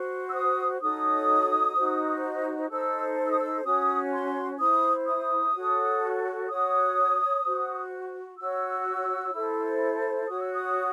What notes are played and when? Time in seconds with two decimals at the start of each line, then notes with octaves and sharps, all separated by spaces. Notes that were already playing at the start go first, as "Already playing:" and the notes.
Already playing: F#4 C5
0.29 E6
0.34 D#6
0.81 D#4 F#4 A4 C#5 D#6
1.75 D#4 F#4 C5
2.70 D#4 A4 C5 E6
3.25 E6
3.31 D#6
3.39 E6
3.64 C#4 F#4 C#5 D#6
4.12 C6
4.59 E4 C5 D#6
5.06 D#6
5.54 F#4 A4 C#5
6.49 F#4 C#5 D#6
7.44 F#4 C5
8.39 F#4 C#5 E6
9.33 E4 A4 C5
10.28 F#4 C#5 D#6
10.41 E6
10.53 D#6